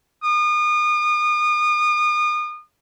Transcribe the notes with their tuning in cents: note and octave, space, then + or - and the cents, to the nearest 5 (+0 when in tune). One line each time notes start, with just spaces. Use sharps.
D#6 -35